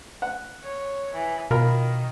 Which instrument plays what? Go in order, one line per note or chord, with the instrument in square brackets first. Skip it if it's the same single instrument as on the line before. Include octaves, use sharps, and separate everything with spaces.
[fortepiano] F#5
[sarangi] C#5
E3
[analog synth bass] B2 [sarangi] D#3 [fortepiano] F4 A#4 B5